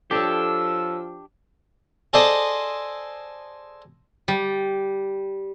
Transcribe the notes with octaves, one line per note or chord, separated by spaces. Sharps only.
F3 D4 G4 A4 C#5 E6
G#4 A4 C5 D5 D#5
G3